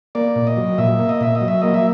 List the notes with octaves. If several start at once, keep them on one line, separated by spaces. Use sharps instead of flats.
A#3 D5
A#2
D#5
F#3
A#2 E5
A#3
D#5
A#2 E5
D#5
F#3
E5
A#3 D#5
E5